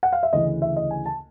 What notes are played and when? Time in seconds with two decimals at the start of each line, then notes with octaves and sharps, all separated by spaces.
0.03 F#5
0.13 F5
0.23 E5
0.33 D2 C#3 E3 D#5
0.62 E5
0.76 D#5
0.91 G#5
1.06 A5